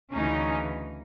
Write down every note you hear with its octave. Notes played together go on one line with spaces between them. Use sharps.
D2 C#3 E3 C#4 D#4